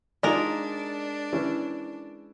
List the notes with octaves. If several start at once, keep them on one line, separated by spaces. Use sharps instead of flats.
G#3 D4 D#4 F4 A#4 D5
E3 C#4